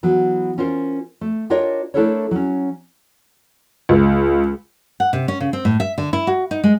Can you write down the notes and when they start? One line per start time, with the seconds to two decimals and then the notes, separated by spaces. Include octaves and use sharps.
0.03 E3 F#3 B3
0.58 C#4 F4 A#4 C5
1.21 A3
1.50 D4 F4 G4 A#4 C#5 D#5
1.94 A3 D4 E4 A4 A#4 C#5
2.31 F#3 C#4
3.89 C#2
5.00 F#5
5.13 C3
5.28 C#4
5.40 C#3
5.53 C4
5.65 A2
5.80 E5
5.98 D3
6.13 E4
6.27 F#4
6.51 D#4
6.64 G#3